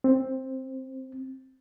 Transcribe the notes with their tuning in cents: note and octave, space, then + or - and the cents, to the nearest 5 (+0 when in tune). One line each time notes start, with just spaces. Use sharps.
C4 +10